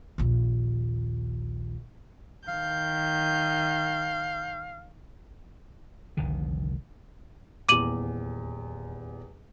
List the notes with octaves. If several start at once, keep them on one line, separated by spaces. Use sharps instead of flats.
A#1 D#2
D#3 F5 G6
F1 C2 D3 D#3
D#1 E2 D6 D#7 F#7